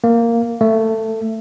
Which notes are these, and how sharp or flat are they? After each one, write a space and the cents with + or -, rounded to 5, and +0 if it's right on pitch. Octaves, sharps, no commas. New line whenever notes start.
A#3 -5
A3 +15